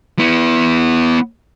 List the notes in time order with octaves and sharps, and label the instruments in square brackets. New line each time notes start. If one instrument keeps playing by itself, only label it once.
[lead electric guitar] B3 E4